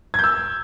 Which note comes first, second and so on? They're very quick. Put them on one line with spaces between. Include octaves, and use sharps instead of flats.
G#6 G6 E6